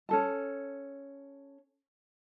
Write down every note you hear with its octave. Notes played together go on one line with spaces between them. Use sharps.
C#4 A4 A5